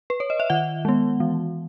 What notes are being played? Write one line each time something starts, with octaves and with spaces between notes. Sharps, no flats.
B4
C#5
D#5
E5
D#3 F#5
G#3 B3
E3